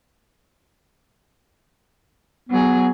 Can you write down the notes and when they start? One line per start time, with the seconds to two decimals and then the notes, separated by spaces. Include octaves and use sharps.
2.49 F#3 B3 G#4